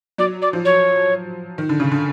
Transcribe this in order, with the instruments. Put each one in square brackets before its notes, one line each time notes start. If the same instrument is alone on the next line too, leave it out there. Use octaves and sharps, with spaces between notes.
[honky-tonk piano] F#3 [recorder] D5
[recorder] D5
[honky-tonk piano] F3
[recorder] C#5
[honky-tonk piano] D#3
D3
C#3
D3